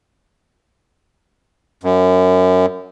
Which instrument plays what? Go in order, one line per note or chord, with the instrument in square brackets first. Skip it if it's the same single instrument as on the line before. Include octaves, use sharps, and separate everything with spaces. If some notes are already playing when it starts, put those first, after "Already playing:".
[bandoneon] F#2